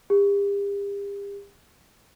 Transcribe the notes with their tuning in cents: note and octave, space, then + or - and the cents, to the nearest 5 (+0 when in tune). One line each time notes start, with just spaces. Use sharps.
G4 +40